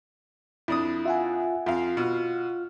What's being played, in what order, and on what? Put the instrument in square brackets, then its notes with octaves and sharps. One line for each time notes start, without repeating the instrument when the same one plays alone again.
[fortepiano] F2 D4 D#6 [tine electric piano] E4
[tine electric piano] F4 [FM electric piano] E5 F#5 G#5
[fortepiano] F2 F5 [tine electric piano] F4
[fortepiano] B2 [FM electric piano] F6